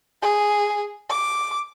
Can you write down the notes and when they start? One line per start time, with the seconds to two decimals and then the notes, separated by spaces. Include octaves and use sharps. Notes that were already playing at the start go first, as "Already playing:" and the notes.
0.22 G#4
1.10 D6